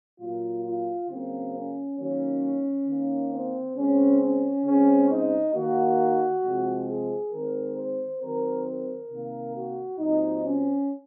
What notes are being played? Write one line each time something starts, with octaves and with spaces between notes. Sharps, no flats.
A#2 F#3 A#3 F4
F4
C#3 F#3 A#3 C4
C#4
D#3 F#3 A#3 C#4
D#3 A#3
C4
C#3 G#3 C4 C#4
C#4
C#3 G#3 C4 C#4
D#4
D#3 A#3 F#4
C3 F3 G#3 C4
G#4
D#3 G#3 C4 A#4
C5
D#3 F#3 C4 A#4
A#4
C3 D#3 A#3
F#4
A#2 F#3 C4 D#4
C#4